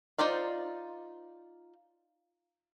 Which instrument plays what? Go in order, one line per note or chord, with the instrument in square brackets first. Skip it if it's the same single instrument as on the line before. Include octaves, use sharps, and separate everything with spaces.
[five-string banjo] D#4 F4 C5 D5 F5